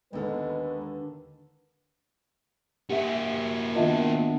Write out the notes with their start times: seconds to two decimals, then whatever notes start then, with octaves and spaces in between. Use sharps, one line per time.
0.13 D#2 D3 D#3 G#3 B3 D#4 A4 B4
2.90 A#3 F#4 G4 E5
3.76 D#3 B3 D4 F4 D#5 E5